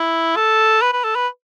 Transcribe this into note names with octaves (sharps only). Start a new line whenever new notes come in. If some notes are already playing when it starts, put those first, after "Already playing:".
Already playing: E4
A4
B4
B4
A4
B4